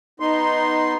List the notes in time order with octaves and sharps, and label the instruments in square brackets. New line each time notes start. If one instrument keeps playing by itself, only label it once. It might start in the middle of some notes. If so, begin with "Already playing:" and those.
[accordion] B3 D#4 C6